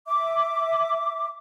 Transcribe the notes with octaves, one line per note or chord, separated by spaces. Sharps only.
E5 D6